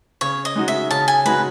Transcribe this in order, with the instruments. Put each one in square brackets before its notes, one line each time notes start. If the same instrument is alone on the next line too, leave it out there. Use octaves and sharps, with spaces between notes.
[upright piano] C#3 [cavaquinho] C#5
[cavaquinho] D#5
[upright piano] G#3 D#4 F#4
[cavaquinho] E5
[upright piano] C#3 [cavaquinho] A5
[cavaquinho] G#5
[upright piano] G#3 D#4 F#4 [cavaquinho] B4